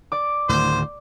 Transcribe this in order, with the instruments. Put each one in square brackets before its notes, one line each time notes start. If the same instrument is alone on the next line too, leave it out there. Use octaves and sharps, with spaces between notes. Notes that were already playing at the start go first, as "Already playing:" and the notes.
[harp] D5 D6
[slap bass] D2 A2 D#3 [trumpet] C5